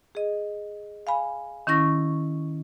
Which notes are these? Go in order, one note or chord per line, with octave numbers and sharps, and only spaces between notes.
G#4 D#5
F5 G#5 B5
D#3 C#4 E4 C#6 A#6